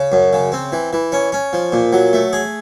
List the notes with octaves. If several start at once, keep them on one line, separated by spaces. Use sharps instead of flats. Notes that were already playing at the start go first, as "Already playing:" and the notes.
Already playing: C#3
F#2
C#3
C4
E3
E3
C#4
C#4
F3
A#2
F#3
A3
G#4